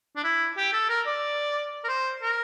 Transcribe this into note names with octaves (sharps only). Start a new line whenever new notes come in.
D4
E4
G4
A4
A#4
D5
A#4
C5
A#4